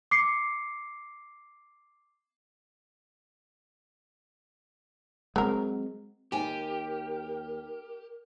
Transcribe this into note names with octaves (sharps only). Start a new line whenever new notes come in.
D6 C7 C#7
F#3 G#3 A3 C4 A#4
D#2 G4 A#4 G#5